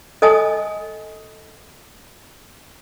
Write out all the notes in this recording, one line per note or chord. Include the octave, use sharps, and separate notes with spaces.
A4 D#5 G#5 A5 D#6